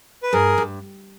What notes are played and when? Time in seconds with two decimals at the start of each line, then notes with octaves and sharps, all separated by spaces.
0.23 B4
0.32 G2 G#4 A#4
0.58 G2